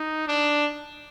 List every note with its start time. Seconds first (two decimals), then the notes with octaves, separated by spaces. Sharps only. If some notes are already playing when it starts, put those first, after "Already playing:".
Already playing: D#4
0.28 D4